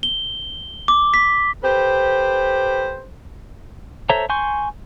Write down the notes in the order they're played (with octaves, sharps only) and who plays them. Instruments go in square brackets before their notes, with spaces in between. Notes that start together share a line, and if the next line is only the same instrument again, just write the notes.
[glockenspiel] G7
D6
B6
[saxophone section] G4 A4 B4 C5
[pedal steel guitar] A4 C5 C#5 E5 A#5
G#5 C6 C#6 G6